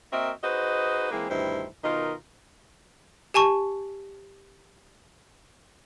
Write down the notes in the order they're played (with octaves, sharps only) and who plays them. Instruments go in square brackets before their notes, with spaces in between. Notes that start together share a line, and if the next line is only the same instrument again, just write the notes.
[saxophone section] A#3 C4 F#4 A#4 D#5 E5
D#4 F#4 G#4 B4 C5 D#5
E3 G#3 A#3 C4 E4 G#4
D2 G2 D#3 E4 C5
B2 D#3 D#4 F4 A#4 D#5
[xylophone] G4 G#5 A5 C#6